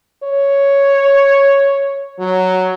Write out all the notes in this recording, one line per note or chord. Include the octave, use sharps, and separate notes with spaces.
C#5
F#3